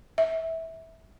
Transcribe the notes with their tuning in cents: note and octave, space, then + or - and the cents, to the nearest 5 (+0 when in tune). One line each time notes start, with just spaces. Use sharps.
E5 -15